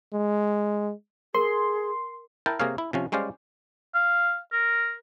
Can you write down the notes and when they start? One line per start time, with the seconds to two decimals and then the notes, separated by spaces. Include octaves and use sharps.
0.13 G#3
1.34 G#4 A#4 C6
2.46 E4 A#4 G5 A5
2.60 C3 A#3 G#4 A#4 C#5 F5
2.78 E4
2.93 C3 F3 C#4
3.12 G3 G#3 C#4 C5 D5 F5
3.95 F5
4.52 A#4